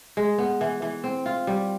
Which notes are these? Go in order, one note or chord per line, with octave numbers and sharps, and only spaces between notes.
G#3
B3
E3
E3
C4
F4
G3